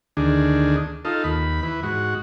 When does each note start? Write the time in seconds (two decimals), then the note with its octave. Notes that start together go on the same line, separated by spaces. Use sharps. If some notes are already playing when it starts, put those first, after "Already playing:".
0.17 D2 D#3 D4 G#4
1.05 D#4 F4 A4
1.24 D#2 B5
1.63 E3 B4
1.83 G#2 F#4